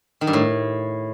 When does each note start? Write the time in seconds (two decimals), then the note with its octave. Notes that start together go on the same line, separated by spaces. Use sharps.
0.21 D#3
0.27 G2
0.33 A2